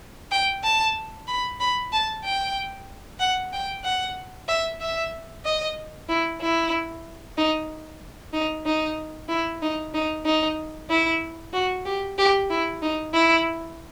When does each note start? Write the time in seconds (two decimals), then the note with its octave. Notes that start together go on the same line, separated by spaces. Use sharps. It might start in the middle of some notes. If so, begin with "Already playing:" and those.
0.31 G5
0.63 A5
1.27 B5
1.60 B5
1.92 A5
2.24 G5
3.20 F#5
3.53 G5
3.84 F#5
4.48 E5
4.81 E5
5.45 D#5
6.09 E4
6.41 E4
7.37 D#4
8.33 D#4
8.66 D#4
9.29 E4
9.62 D#4
9.94 D#4
10.25 D#4
10.90 E4
11.53 F#4
11.85 G4
12.18 G4
12.50 E4
12.82 D#4
13.13 E4